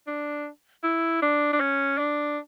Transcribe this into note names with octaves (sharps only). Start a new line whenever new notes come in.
D4
E4
D4
D4
C#4
D4